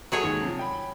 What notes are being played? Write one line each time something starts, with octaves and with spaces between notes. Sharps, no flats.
F#3 F#4 G#4 A4 C#5
D#2 G#3
C3 F3
G5 B5